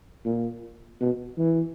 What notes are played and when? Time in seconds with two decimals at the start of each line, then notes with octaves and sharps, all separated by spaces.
0.25 A#2
1.01 B2
1.38 E3